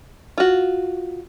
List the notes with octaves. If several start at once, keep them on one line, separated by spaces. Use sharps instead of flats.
F4 F#4